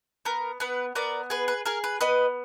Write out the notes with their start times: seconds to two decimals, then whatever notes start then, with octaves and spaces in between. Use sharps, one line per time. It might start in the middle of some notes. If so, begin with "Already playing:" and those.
0.25 B3 A#4
0.60 B3 B4
0.95 B3 A#4 D5
1.30 G#4 B4
1.48 B4
1.65 G#4 A#4
1.84 B4
2.01 B3 B4 D#5